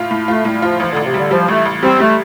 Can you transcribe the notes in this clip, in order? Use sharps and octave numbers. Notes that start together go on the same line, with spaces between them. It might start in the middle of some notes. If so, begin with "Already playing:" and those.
Already playing: A2 F4
A2
A3 F4
A2 G3
F3 F4
A1 F3
A1 D3
C3
D3 G3
F3 G3
A1 A3
A1
G3 C4
G3 A3